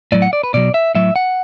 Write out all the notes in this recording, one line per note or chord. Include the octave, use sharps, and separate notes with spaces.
A2 F#3 D5
F#5
D5
B4
B2 F#3 D5
E5
A2 F#3 E5
F#5